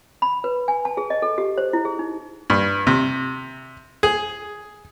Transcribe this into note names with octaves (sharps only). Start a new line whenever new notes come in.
B5
B4
G#5
A5
G#4
D#5
A4
G4
C5
E4
G#4
D#4
G2
C3
G#4